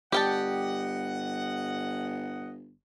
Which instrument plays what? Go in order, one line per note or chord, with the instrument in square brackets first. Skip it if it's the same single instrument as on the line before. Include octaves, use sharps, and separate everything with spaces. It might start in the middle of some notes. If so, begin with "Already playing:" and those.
[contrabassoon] G1 [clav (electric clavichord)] G3 [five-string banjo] G4 G5 A5 [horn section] D#5 F#5